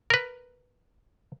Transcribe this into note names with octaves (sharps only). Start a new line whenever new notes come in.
A#4 B4